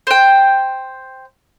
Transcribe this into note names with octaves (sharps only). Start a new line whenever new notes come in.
C5 G5